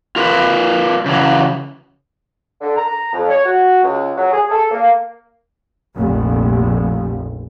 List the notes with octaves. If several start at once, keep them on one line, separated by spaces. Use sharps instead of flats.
F4 A#4 B4
C#3 E3 F#3
D3
A#5
F2
C#5
F#4
C#2
F#3
G#4
A4
A#3
F1 A#1